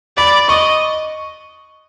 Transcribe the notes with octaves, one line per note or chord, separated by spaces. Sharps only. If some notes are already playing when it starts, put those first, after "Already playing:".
D5 B5
D#5 C#6